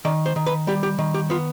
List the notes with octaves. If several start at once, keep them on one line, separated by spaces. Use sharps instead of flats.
D#3 D5
C5
D#3
B4
G3 G4
G4
D#3
G4
B3 F4